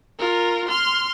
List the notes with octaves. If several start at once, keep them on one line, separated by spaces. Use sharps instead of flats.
F4 A#4
C6 F6